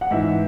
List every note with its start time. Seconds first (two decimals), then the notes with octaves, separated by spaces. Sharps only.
0.01 F#5
0.11 G#2 E3 E5